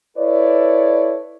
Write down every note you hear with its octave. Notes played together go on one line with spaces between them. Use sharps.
E4 A4 B4 C#5 D5